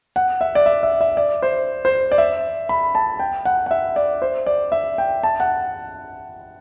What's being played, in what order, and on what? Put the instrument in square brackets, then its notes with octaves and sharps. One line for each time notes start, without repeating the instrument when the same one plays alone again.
[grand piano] F#5
E5
D5
E5
E5
E5
D5
C5
C5
D5
E5
B5
A5
G5
F#5
F#5
E5
D5
C5
D5
E5
G5
A5
F#5